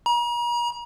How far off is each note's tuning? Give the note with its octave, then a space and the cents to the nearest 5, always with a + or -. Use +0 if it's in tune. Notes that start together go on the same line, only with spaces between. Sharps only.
A#5 +40